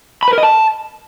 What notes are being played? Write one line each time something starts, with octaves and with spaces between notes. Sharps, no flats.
B5
B4
A#4
D#5
A5